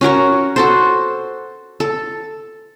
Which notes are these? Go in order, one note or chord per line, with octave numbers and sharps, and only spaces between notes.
C#4 F#4 A#4 C#5
F#4 A4 C5
A4